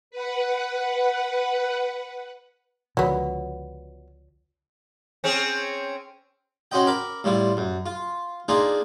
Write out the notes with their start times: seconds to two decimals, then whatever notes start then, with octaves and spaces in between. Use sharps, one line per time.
0.11 B4 F#5
2.97 C#2 D3 F3 F#3 B3 F4 C#5 D5
5.24 C4 C#4 G#4
6.71 C#4 F#4 C5 D#5 G5
6.87 A#4 B5 D6
7.24 A2 G3 E4 F4
7.57 F#2
7.86 F4
8.48 A#3 D4 D#4 F4 G#4